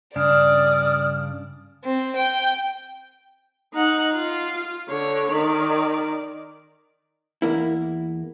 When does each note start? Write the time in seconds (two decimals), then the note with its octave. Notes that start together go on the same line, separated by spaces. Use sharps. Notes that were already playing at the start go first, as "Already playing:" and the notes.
0.16 G2 C#3 D4 D5 D#6 F6
1.84 C4
2.16 G5
3.74 D#4 F#5
4.14 F4
4.89 D3 C#5
5.32 D#3 D5
7.42 E2 A#3 E4